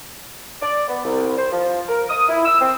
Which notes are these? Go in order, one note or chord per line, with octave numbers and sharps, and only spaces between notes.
D5
B3
C2
C5
F3
A#4
D#6
E4
E6
C4